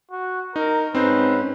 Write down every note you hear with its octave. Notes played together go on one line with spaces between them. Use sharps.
F#4
D#4 A#4
G#2 C4 C#4 D#4 B4 C5